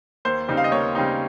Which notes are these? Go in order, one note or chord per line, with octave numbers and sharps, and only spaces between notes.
D#2 C5
C#3 G3 C4 D#4
F5
D#5
D#2 C#5
C#3 G3 C4 D#4